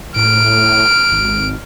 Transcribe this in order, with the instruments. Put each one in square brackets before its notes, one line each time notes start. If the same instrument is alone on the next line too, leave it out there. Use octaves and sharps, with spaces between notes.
[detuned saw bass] A2 [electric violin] F6 D7
[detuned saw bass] G#1